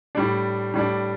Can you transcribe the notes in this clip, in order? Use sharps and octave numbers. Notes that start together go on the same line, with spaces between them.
A2 G3 D4
A2 G3 D4